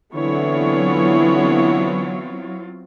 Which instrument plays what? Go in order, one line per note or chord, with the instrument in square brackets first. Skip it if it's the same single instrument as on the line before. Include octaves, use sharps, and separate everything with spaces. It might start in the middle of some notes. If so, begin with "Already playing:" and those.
[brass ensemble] D3 E3 [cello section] F#3 C4 F4 [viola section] B3 E4 C#5